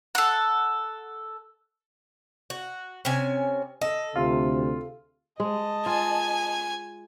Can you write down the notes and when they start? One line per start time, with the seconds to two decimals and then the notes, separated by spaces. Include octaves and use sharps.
0.15 A4 F#5
2.50 F#4
3.05 C3 C#4 G#5
3.81 A4 D#5
4.16 D2 C3 F4
5.40 G#3 D#5 A5
5.86 F4 G#5